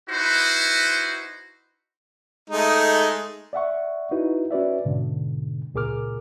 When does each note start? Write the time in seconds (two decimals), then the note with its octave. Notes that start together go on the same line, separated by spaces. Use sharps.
0.10 D#4 E4 F#4 B4 C5
2.50 G#3 A3 D#4
3.53 D5 E5 F#5 C#6
4.11 D#4 E4 F#4 B4
4.51 C#4 F#4 B4 D5 E5
4.85 G#2 B2 D3
5.74 C#2 A#2 G#4 A#4 D6 F6